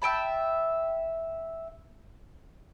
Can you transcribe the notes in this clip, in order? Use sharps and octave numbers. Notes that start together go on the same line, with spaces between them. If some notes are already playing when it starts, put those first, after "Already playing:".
E5 G5 A5 B5